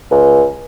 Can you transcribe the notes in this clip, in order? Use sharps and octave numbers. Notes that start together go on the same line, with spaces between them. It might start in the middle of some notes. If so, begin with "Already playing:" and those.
C#2